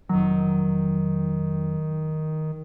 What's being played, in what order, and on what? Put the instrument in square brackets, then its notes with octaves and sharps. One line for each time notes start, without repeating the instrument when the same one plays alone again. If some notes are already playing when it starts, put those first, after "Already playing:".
[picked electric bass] F1 F#3 [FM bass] D#3